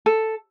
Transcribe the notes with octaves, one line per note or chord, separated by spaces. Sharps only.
A4